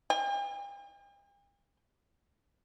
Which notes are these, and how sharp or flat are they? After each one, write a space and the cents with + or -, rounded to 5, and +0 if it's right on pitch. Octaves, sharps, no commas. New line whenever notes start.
G5 +45